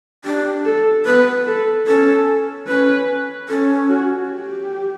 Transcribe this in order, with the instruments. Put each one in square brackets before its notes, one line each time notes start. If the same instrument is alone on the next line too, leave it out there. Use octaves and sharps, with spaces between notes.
[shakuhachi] D4 [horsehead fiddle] G4
[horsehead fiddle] A4
[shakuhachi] B3 [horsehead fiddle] B4
[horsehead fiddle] A4
[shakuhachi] C#4 [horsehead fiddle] A4
[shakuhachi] C#4 [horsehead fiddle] B4
[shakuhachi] C#4 [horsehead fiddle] A4
[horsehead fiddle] F#4
G4